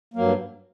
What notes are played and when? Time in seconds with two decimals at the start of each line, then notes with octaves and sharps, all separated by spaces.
0.14 A#3
0.16 F#3
0.19 G2